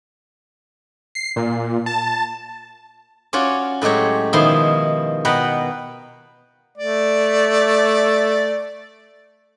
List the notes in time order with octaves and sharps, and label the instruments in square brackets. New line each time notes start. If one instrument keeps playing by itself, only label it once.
[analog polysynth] C7
A#2
A5
[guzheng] C#4 F4 F#4 C#5 D5
A2 F#3 G#3 G4 C#5
B2 D#3 F3 E4 C6
B2 B4 F#5 G5 A#5
[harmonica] A3 D5